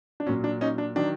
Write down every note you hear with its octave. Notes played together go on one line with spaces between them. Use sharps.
D4
A#2 F#3 C#4
D4
C#4 D#4
D4
D#3 F#3 D4